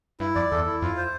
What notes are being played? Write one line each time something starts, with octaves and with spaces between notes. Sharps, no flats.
G2 E4
F2 D5
E2 A4
E4
F2 F4
C5